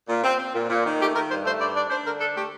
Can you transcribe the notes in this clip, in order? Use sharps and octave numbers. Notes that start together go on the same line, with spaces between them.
A#2
C4
C4
A#2
A#2
D#3
A3 G4
D#3 A#4
G2 C5
A3 C5
G2 D5
D4 D5
D4 C5
D3 A#4
D4 A4
A3 G4